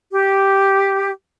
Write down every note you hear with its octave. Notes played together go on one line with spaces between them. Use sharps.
G4